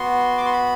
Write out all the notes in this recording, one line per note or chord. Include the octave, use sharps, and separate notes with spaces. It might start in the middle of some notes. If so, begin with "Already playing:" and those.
Already playing: B3 F#4 C6
D6
C6
B5